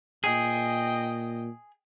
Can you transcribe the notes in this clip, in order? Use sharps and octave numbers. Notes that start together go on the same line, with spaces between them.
A#2 G#4 D#5 G5